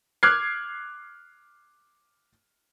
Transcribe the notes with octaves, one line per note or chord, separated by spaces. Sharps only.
D6 F6 F#6 G#6 C7